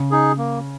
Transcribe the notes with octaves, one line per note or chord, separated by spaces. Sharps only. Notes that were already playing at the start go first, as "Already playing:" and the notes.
Already playing: C#3
D#4 G#4
A#3